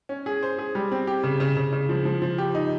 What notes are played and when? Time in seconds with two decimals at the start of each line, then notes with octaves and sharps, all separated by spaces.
0.09 C#4
0.26 G#4
0.43 C5
0.59 G#4
0.75 G3
0.92 C4
1.07 G4
1.23 C#3
1.40 C#3
1.56 C#3
1.73 C#3
1.89 F3
2.05 F3
2.22 F3
2.38 G4
2.54 D#4